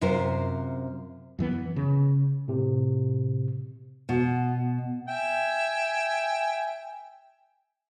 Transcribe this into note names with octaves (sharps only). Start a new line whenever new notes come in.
F#2 C3 F4 A#4 C5
F#2 E3 B3
C#3
A2 C3
B2
E5 G5 G#5